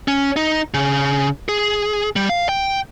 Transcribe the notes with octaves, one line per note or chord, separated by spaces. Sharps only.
C#4
D#4
C#3
G#4
G3
F5
G5